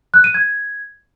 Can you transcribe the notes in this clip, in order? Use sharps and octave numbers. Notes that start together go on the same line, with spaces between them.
F#6
D#7
G#6